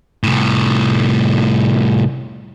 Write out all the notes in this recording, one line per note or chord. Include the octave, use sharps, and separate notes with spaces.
C2 A2